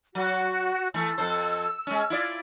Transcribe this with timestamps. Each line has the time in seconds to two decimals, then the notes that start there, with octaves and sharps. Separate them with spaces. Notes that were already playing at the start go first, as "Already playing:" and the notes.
0.15 F#3 F#4
0.94 E3 A3 E6
1.18 F2 A4 C5
1.87 G#3 C#4
2.10 E4 F4 D5